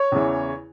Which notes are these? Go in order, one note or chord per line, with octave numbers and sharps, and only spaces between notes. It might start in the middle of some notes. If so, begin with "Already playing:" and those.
Already playing: C#5
E2 C#3 E3